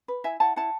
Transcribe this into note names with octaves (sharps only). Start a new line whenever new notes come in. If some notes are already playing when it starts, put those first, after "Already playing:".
B4
E4 E5 G#5
E4 F#5 A5
E4 F#5 A5